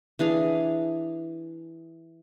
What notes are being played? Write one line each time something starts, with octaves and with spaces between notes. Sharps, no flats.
E3 D4 G#4 F5